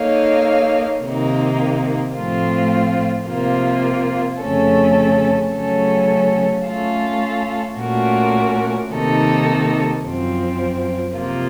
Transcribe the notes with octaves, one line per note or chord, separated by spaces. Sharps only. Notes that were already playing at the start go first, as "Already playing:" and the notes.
Already playing: A#3 D#4 A4 C#5 F5
C3 D#3 A#3 D#4
A2 F3 A3 C4 F4
C3 F3 A#3 F4
F2 C#3 A3 C#4 A4
C#3 F#3 A3 C#4 A4
A3 C#4 F4 A4
A#2 A3 C#4 F#4 A#4
C3 D#3 A#3 D#4 A4
F#2 F3 C4
C3 F3 A#3 F4